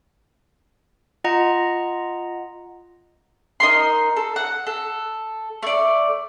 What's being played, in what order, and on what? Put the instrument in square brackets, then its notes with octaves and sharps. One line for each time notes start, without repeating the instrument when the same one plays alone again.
[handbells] F4 D#5 F#5 A#5
[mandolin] D#4 A#4 C6
A4
F#5
A4
A3 D5